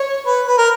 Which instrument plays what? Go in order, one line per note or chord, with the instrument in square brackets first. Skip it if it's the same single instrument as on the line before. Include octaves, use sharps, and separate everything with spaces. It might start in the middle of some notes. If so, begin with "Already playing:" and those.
Already playing: [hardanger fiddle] C#5
[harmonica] B4
B4
A#4